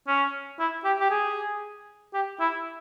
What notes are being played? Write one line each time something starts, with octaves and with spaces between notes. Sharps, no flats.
C#4
E4
G4
G4
G#4
G4
E4